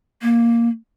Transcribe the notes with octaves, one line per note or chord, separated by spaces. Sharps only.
A#3